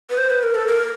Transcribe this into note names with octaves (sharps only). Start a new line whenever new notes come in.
B4
C5
B4
A#4
A4
A#4